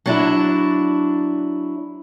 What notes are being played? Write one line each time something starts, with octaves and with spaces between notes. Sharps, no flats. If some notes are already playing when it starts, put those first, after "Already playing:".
F#3 D4 E4